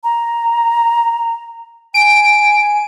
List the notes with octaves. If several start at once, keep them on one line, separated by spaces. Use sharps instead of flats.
A#5
G#5 D7